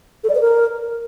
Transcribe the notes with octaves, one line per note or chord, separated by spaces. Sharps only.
A4
D5
B4
A#4